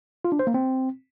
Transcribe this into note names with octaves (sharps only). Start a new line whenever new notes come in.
F4
D4
C5
A#3
C4